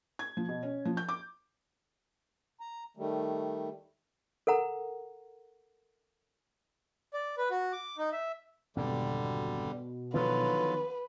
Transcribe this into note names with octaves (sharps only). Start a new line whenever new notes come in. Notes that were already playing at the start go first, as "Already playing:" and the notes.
G#6
F3
B2
C#4
F3
G6
D6
A#5
D#3 G3 A3
A4 A#4 F#5 A#5
D5
B4
F#4
D6
D#4
E5
G#1 F2 B2 D3 G3
D3 D#3 F3 F#3 B3 F4 B4